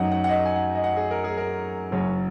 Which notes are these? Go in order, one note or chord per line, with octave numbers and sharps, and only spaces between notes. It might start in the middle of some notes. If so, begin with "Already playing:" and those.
Already playing: F#2 F#3 D#4 F#5
F#5
F#5
D#5
G#5
F#5
D#5
F#5
G#4
A#4
G#4
A#4
F#1 F#2 F#3 C#4